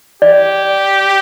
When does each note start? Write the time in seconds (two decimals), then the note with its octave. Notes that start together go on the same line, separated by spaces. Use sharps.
0.22 G4 D5